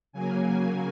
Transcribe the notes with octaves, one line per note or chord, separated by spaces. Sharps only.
C#3 F#3 A#3 G#5